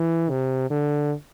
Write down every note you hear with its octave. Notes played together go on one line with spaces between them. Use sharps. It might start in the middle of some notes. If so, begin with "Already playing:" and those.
Already playing: E3
C3
D3